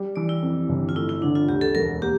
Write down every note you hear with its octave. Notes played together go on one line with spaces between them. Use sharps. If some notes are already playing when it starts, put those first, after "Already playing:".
Already playing: G3
E3 D5
E4
F2
G1
F4
A3 E4
E4
D3 D4
F4
D2 G4
A4
E1 A#4
A#3 G4